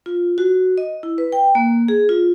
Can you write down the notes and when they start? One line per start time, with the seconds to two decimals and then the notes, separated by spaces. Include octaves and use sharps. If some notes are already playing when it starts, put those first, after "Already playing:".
0.06 F4
0.38 F#4
0.78 D#5
1.03 E4
1.18 B4
1.32 G5
1.55 A#3
1.88 G#4
2.09 F4